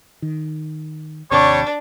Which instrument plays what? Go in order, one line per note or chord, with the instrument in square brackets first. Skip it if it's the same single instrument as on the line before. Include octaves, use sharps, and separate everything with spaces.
[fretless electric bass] D#3
[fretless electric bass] G#1 D#2 C3 [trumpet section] G3 C#5 C#6 [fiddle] D4